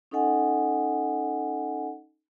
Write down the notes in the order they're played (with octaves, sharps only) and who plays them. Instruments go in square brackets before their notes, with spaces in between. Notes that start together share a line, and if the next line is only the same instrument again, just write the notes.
[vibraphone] C#4 D#4 A4 D#5 F#5 G#5